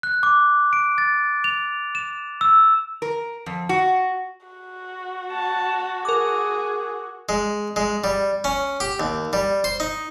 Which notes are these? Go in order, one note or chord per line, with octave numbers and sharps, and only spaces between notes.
F#6
D6
D7
A6
F7
E7
E6
A#4
F2
F#4
F#4
A5
G#4 A#4 D6
G#3
G#3
G3
C#4
G4
D#2
G3
C5
D#4